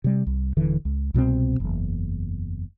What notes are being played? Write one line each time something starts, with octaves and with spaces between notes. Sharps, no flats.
C3 G3
C2
D#1 D3 E3
C#2
C2 B2 A3 C4
F#1 E2